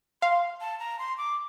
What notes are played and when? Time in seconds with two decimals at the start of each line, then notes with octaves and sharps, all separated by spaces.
0.22 F5 C6
0.61 A5
0.79 A#5
0.99 C6
1.18 D6